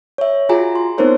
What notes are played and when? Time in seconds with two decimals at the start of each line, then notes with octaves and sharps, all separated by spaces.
0.18 C#5 E5
0.49 F4 F#4 G#4 G#5 A#5
0.76 C6
0.98 B3 C4 D#4 A#4 C5 C#5